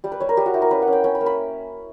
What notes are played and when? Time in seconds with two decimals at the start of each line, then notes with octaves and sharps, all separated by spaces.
0.04 G3 G4
0.12 B4
0.20 G3 C#5
0.29 A#4
0.37 G3 G4
0.46 F#4
0.54 E4 G4
0.62 A#4
0.70 C#4 B4
0.82 F#5
0.88 C#4
0.93 G5
1.04 C#4 G5
1.15 B5
1.21 A#3
1.26 B5